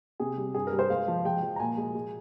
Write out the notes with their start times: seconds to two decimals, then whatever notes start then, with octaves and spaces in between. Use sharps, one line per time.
0.20 C3 G#4
0.37 G3
0.54 G2 G#4
0.67 A#4
0.72 G3
0.79 C5
0.90 G#3 F5
1.08 F3
1.25 G#3 G5
1.42 F3
1.56 A#5
1.60 A#2 G#5
1.77 G#3
1.95 G#3